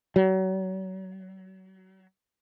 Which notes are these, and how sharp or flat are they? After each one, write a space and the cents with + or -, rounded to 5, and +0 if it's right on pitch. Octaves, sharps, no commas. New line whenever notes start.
F#3 +35